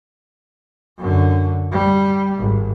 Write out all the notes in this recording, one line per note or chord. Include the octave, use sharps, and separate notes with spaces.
F#2 D3
G3
G#1